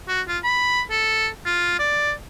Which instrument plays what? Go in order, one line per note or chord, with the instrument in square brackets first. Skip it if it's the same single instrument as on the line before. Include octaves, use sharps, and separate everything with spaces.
[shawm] F#4
F4
B5
A4
F4
D5